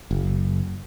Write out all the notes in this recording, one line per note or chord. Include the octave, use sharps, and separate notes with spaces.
F#1